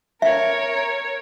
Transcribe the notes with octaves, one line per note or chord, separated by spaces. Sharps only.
A#4 C#5 E5